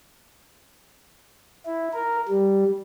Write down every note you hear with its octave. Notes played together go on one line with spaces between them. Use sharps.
E4
A#4
G3